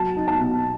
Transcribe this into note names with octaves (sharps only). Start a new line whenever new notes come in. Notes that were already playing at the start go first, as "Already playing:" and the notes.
Already playing: F#3 A5
D#4
A5
B2